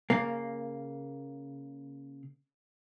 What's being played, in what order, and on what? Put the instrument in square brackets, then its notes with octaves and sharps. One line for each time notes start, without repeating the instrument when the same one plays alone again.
[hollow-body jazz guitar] C#3 A#3